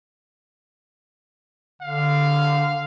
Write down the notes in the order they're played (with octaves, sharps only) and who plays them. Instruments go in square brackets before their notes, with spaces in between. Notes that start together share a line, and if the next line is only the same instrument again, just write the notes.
[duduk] D3 [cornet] F5